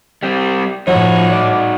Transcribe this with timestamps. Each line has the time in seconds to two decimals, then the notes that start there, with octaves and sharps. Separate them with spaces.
0.23 G3 C4 G4
0.87 A2 F3 D#4 F#4 C#5
1.31 D5